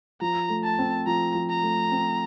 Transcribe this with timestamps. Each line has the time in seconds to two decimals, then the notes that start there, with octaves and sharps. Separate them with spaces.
0.21 F3 A#5
0.49 A3
0.64 A5
0.79 C4
1.06 F3 A#5
1.35 F3
1.50 A#5
1.63 A3
1.92 C4